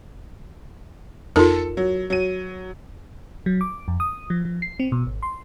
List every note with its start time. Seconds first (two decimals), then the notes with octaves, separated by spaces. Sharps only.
1.36 F2 D#4 F4 A4 A#4
1.77 F#3
2.10 F#3 D#7
3.46 F#3
3.61 D6
3.88 F2
4.00 D#6
4.30 F3
4.45 F3
4.62 C7
4.80 C4
4.92 B2
5.06 G#1
5.23 C6